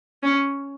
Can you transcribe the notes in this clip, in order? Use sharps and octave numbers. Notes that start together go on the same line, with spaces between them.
C#4